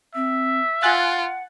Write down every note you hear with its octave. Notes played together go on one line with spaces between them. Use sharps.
C4 E5
F4 F#5 G#5 F#6 A6